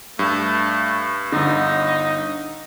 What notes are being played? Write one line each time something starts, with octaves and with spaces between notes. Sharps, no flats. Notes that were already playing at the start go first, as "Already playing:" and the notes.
G2 A3
G1 D3 D#4